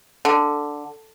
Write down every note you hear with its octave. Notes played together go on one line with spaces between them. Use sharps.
D3